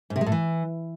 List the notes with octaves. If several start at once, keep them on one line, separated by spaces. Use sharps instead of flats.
G#2
C3
G#3
A2
E3